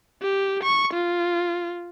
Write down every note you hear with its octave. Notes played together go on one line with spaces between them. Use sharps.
G4
C#6
F4